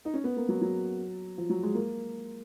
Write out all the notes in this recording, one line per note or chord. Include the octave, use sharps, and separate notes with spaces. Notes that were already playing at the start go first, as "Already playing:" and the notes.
D#4
C#4
B3
A#3
F#3
F#3
F3
F#3
G#3
A#3